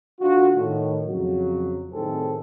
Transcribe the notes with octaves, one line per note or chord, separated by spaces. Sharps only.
D3 F4 F#4
A2 D#3
F2 C#3 F#3
A2 C3 D#3 C4 G#4 A4